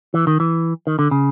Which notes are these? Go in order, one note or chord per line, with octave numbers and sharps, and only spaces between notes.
E3
D#3
E3
D#3
D3
C#3